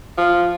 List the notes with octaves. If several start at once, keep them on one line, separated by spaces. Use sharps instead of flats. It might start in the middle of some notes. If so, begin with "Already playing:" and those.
F3